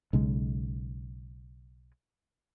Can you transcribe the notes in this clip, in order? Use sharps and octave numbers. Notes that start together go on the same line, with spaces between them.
B1 C#3 G#3